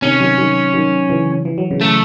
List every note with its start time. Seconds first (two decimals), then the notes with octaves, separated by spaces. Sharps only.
0.02 C3 D#3 C#4
0.20 D#3 F#3
0.38 D#3 F#3
0.74 D#3 F#3
1.10 C#3 E3
1.45 E3
1.58 F#3
1.71 C#3 E3
1.81 A3